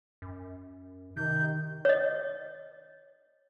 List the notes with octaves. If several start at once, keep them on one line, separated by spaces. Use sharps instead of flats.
F#2
C3 D#3 G6
C#5 D#5